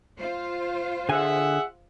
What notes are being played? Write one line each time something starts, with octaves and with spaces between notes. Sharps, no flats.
F4 C5
D3 G#4 E5 F#5 G#5